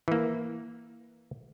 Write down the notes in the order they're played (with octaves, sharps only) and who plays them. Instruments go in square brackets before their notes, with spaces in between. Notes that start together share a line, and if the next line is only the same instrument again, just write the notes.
[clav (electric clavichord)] E3 A#3